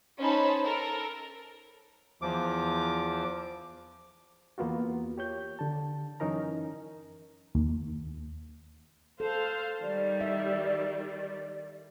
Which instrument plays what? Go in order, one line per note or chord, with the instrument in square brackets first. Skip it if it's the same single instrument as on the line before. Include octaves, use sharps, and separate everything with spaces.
[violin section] C#4 D#4 C5 A5 B5
A4 A#4
[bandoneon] E2 F3 D6
[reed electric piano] E2 A#3 B3 F4 F#4
G4 C#5 G6
D3 A5
F#2 E3 C#4 D#4 A#4 A#5
[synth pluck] D#2
[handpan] A4 [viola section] C5 F5
[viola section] D#3 G3 [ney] D5
[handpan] E5